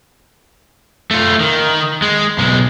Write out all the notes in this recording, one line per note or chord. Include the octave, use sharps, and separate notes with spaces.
A3 F4
D#3
G#3
B1 G#3